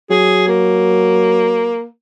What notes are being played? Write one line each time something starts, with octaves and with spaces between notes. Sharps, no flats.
F#3 G#4
A#3